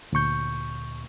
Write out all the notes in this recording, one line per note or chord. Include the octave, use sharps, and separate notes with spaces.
D2 A#2 C#6 G6